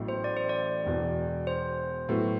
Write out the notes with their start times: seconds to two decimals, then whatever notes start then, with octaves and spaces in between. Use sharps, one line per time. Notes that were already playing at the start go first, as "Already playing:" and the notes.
Already playing: A1 A2 F#3 B3 E4
0.08 C5
0.24 D5
0.37 C5
0.49 D5
0.85 E1 E2 B2
1.47 C5
2.09 A2 F#3 B3 F#4